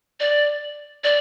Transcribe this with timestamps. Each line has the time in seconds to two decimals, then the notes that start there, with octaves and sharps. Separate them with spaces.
0.20 D5
1.04 D5